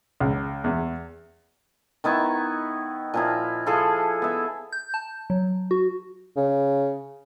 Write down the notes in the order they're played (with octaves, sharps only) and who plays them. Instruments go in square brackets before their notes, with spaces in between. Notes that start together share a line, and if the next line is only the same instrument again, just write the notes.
[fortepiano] C#2
E2
[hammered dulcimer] D#3 B3 E4 C#6
A#2 F3 E4
F3 E4 G#4 A4
B3 E5
[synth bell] G6
A5
F#3
F#4
[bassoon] C#3